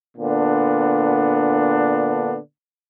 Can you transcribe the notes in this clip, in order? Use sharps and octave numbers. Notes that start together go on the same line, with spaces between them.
A#2 D3 B3 D4